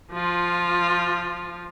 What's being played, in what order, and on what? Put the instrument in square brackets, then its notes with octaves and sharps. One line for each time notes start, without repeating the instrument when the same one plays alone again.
[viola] F3 F4